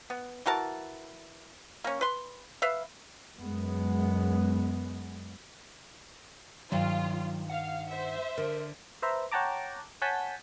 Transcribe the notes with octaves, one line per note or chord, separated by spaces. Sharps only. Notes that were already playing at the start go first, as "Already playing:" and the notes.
B3
E3 F#4 A#4 A5
A#3 C#4
B4 C6
B4 E5 F5
F#2 G#3 B3
G2 D#3 F#3 F4
F5 F#5
C5 E5
D3 A#4
B4 C5 E5 A#5
C#5 F#5 G5 A5 A#5 D6
C#5 F#5 G#5 A5 G6 B6